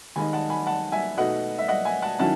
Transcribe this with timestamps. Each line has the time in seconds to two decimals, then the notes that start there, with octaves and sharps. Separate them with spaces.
0.16 D#2 D#3 G#3 D#4 G#5 B5
0.33 F#5 A5
0.50 G#5 B5
0.67 F#5 A5
0.92 E5 G#5
1.18 B2 A3 D#4 D#5 F#5
1.59 E5
1.68 D#5 F#5
1.85 E5 G#5
2.02 F#5 A5
2.19 D#3 F#3 C#4 E4 F#5 A5